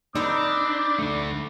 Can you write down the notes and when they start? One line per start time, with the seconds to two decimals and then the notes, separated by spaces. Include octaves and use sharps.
0.15 C4 D4 D#4 A#4 B5 D6
0.99 A3 D4